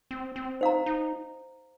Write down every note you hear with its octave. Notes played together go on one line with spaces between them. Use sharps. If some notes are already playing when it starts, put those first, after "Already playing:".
C4
C4
D#4 C5 F5 A#5
D#4